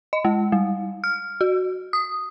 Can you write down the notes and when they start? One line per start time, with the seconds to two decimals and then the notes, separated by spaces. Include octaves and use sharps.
0.13 D#5
0.25 G#3
0.52 G3
1.04 F6
1.41 F#4
1.93 D#6